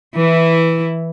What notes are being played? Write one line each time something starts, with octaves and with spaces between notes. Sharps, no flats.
E3 E4